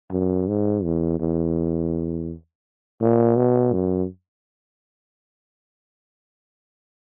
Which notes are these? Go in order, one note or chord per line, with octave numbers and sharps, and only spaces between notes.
F#2
G#2
E2
E2
A#2
B2
F#2